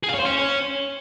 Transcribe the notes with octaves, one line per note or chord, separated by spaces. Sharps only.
G#4
F5
C#5
C5
C#4